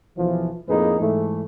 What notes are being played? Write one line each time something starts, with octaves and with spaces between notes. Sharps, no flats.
B1 E3 F3
F2 A2 A#3 D#4 G#4 B4
G#2 E3 A3